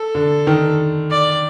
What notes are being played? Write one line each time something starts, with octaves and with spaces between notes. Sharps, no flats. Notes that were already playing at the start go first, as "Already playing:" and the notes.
Already playing: A4
D3
D#3
D5